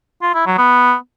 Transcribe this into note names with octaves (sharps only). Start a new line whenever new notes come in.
F4
E4
F#3
B3